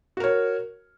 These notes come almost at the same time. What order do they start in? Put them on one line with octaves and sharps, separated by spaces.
F#4 A#4 C#5